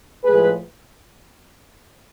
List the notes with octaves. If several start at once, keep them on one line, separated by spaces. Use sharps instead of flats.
A2 F3 G#3 G#4 B4